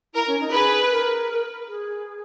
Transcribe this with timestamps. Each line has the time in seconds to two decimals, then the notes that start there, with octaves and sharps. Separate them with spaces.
0.14 E4 A#4
0.27 C#4
0.40 D#4
0.52 G#4 B4
0.91 A#4
1.67 G#4